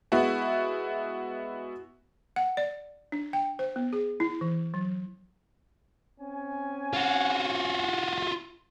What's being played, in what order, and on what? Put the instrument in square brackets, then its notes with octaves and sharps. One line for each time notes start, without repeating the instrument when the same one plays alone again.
[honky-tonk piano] G#3 B3 E4 F#4
[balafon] F#5
D5
D4
G5
C5
B3
G#4
E4
E3
F#3
[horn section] C4 C#4 G#5
[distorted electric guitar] F4 F#4